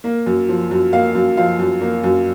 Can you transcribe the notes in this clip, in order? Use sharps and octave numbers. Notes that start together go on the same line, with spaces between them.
A#3
F#2
F3
F#2
A#3 F5
F#2
F3 F5
F#2
A#3
F#2